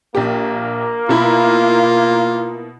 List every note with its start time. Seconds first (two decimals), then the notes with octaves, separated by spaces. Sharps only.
0.15 A#1 A#3 G4
1.09 B2 E4 F4 B5